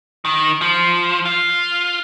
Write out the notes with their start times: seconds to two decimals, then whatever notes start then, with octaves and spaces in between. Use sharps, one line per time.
0.25 D#3
0.61 F3
1.25 F4